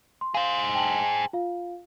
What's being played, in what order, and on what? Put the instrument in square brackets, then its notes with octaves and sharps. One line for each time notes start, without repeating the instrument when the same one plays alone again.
[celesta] C6
[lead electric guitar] G#4 C5 [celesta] F5
[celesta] G5 A5 F#7
F4 F5